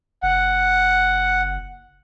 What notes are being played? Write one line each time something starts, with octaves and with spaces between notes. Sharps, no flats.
F#1 F#5